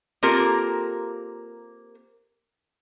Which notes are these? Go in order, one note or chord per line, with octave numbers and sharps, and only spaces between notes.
A#3 C4 F4 G4 A4 A#4